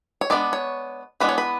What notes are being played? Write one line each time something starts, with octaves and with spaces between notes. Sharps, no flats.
C#5
G#3 B3 D4 D5
C#5
E3 G#3 B3 D4 B4
C#5
B4